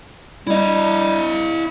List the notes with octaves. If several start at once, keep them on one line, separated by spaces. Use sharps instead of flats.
G3 E4 D#5